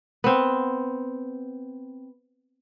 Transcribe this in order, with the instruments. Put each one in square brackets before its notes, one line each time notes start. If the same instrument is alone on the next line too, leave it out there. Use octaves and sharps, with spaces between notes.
[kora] B3 C4